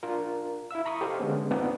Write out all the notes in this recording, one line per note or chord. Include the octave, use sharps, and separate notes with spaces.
D4 F4 A#4
E4 E5 F5 E6
A#5 B5 C#6 D#6
G4 A4 C5 D#5 F5
D3 G#3 B3 C#4
B3 C4 D4 D#4 F4